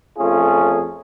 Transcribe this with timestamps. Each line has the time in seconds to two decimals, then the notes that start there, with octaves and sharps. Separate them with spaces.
0.18 F2 A3 C#4 F4 G#4